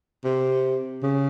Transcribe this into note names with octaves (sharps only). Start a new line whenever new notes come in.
C3
C#3